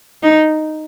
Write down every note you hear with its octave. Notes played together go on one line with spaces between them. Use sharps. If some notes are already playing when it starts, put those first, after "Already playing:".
D#4